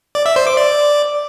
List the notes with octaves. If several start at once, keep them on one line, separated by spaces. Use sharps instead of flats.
D5
E5
C5
D6
D5